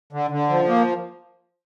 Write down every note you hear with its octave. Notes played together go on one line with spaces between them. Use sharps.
D3
D3
F3
A#3